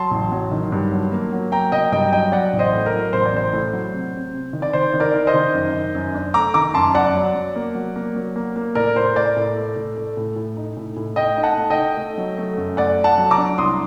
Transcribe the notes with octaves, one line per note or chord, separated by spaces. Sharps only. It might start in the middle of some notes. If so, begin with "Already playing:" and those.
Already playing: F#3 A5 C6
A1
F#3
D#3
G2
F#3
A#3
F#3
A#3 G5 A#5
F#3 D#5 G5
G2 D#5 G5
F#3 D#5 G5
F#3 D5 F#5
A1
C5 D#5
A2
A#4
F#3
A1 C5
D5
A1 C5
A2
F#3
C3
C3
C3
D#3
D5
D#3 C5
D#3
A#4 D5
D#3
C5 D#5
D#3
F#2
D#3
F#2
D4
A3 A#5 D6
D#3 A#5 D6
F#2 A5 C6
F#2 D5 F#5
F#3
F#3
A#3
F#3
A#3
F#3
A#3
A#3
A2 A#4 D5
A2 C5
A3 A#4 D5
A2
A3
A2
A3
A2
A2
D#4
A2
A2
A3 D#5 G5
D#4
F#5 A5
A3
D#5 G5
D#4
A3
F#3
A3
F#2
A3 D5 F#5
A3
F#5 A5
F#3
A#5 D6
D4
C2 C6 D#6